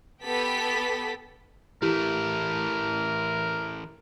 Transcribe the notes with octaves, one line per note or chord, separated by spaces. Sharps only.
B3 G4 A4 B6
E3 A3 E4 G4 A#4